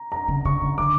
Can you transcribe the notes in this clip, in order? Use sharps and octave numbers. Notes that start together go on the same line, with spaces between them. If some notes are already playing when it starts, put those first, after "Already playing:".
Already playing: A#5
A#5
C#3
C#3 C#6
C#3
D3 D6